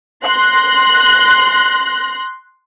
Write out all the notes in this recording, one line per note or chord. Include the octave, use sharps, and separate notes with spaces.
C6 F#6 A#6